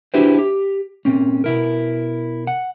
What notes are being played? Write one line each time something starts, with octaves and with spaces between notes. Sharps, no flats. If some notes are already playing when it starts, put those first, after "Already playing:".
D4 E4 F#4 G4 B4 C5
G4
A#2 C4 C#4
B2 E4 A#4
F#5